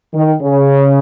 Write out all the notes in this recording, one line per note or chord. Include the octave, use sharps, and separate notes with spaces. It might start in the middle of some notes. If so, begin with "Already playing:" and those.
D#3
C#3